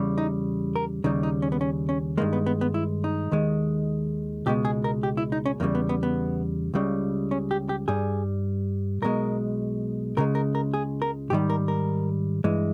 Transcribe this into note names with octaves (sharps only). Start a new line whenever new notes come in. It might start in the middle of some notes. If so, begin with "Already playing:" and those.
Already playing: E2 C#3 G3
D#4
A#4
D#2 C#3 G3 D#4
D#4
C#4
B3
C#4
C#4
G2 D#3 G#3 A#3
B3
B3
B3
E4
D#4
D#2 D#3 G#3
C#2 B2 G#3 G4
G#4
A#4
G4
E4
D#4
C#4
E2 C#3 G3 A#3
B3
B3
B3
C#2 C#3 G3
C#4
G4
G4
G2 G3 G#4
B1 B2 G#3 A#4
C#2 C#3 G#3 A#4
A#4
A#4
G#4
A#4
G#2 D#3 G3 G4
A#4
A#4
G2 E3 G#3